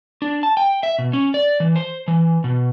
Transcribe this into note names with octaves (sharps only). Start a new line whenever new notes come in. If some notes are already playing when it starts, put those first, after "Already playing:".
D4
A5
G5
E5
B2
C#4
D5
E3
C5
E3
B2